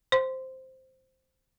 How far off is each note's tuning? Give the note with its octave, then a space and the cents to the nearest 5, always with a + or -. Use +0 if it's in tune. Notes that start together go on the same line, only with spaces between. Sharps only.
C5 +0 C6 -15